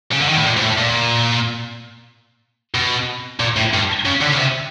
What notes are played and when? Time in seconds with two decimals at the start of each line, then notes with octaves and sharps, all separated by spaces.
0.12 C#3
0.21 D3
0.29 D#3
0.37 A2
0.45 A#2
0.57 G#2
0.62 A2
0.78 A#2
2.74 B2
3.40 A#2
3.56 A2
3.74 G2
4.06 C#3
4.22 D3
4.33 C#3
4.39 C3